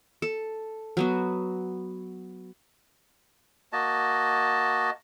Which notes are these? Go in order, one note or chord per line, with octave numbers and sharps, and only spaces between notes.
A4
F#3 B3 F#4
A#3 F#4 D#5 A5